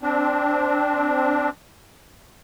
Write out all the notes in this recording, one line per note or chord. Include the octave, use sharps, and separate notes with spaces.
C4 D4